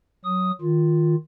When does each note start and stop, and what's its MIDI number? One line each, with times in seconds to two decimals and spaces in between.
0.25 0.51 54
0.25 0.51 87
0.61 1.15 51
0.61 1.15 65